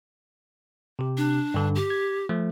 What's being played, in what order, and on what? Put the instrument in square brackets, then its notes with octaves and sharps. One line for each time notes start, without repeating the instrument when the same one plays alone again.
[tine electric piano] C3 G4
[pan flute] D4
[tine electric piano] G2 D3
[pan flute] G4
[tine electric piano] G#6
F3 A3